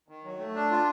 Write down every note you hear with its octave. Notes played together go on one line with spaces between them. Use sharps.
D#3
F#3
A3
D4
F4